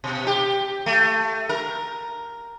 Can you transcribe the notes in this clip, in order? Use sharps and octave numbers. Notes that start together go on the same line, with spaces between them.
B2
G4
A3
A#4